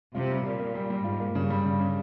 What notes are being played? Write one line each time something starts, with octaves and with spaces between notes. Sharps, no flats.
C3 F4
G3
A#2 F4
A#3
G3
G3
G#2 F4
A#3
G2 C#3
G3
G2 C#3
C#3